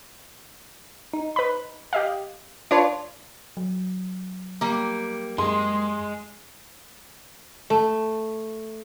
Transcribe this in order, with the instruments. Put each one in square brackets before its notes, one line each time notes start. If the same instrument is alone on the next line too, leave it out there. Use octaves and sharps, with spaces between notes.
[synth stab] D#4
[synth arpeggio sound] B4 B5
G4 D#5 F5
[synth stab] D4 F4 [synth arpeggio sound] B4 C#5 D5
[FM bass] F#3
[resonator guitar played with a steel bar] G3 A#3
[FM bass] F#2 [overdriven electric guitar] G#3 G#4 [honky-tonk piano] C6
[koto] A3